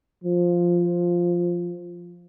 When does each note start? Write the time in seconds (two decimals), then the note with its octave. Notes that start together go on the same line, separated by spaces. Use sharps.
0.24 F3